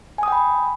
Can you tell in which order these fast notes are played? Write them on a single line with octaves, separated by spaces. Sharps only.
G#5 D#6 G5 B5